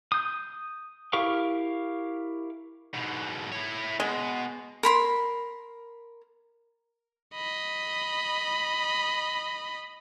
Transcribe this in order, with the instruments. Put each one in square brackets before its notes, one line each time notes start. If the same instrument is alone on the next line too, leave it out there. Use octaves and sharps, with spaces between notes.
[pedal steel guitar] D#6 G6
E4 G4 A#4 F5 C#6
[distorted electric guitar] G#2 B2
E4 C#5
[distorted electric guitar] B2 [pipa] G#3
[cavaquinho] A#4 B5 C6
[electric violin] D#5 B5